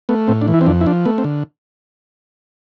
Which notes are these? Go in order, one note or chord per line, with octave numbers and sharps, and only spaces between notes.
A3 B3
A2 C4
D4
E3
E4
C4
F2 D4
E4
F3 D4
A3 B3
C4
D3